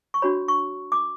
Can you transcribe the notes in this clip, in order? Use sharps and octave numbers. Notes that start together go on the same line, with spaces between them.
C#6
D4 F#4 C#5 B5
C#6
D6